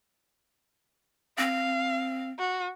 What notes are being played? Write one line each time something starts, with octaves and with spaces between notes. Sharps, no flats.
C4 F5
F#4